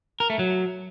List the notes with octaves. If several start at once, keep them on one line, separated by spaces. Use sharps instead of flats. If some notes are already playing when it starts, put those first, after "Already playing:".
A#4
A3
F#3